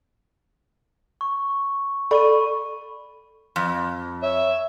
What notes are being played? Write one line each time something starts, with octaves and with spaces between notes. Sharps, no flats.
C#6
A4 D5 B5 C#6 D#7
F2
C#5 E5